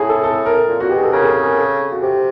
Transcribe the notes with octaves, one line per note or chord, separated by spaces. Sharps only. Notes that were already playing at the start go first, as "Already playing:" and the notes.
Already playing: A2 G#4
A4
A4
A#4
A#2
A#2 F#4
B2 G4
G#4
A4
C#3 A#4
G#4
A4
A#4
A4
F#4
C3 G4